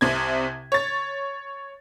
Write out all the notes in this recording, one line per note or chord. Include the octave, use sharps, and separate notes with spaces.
C2 C3 G#6
C#5 A6